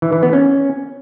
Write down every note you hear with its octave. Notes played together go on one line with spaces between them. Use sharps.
E3
E3
B3
C#4